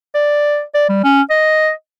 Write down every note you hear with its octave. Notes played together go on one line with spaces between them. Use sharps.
D5
D5
G3
C#4
D#5